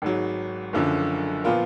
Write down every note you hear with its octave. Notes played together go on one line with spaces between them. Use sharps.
G#1 G#2 F#3
F#1 F#2 D3 F3
A#2 F3 B3 F4 A#4